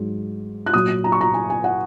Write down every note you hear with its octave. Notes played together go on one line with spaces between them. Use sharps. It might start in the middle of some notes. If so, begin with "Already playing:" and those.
Already playing: G#2 F#3
F#6
A#2 F#3 D#6
A#5
C#6
A#5
G#5
G#5
F#5